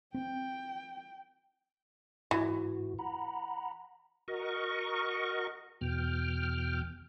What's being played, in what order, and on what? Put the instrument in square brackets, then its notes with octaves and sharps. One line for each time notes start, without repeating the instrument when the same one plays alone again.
[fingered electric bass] C4 [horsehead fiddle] G5
[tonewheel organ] G#2 F#4 [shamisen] E3
[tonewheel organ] F#5 A#5 B5
F#4 A#4 D#5 C#6
E2 B2 G5 F6